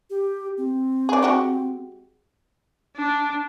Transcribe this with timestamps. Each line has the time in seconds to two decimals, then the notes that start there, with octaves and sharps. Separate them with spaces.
0.10 G4
0.58 C4
1.09 G#4 D5
1.22 G#3 F#4 G4
2.97 D4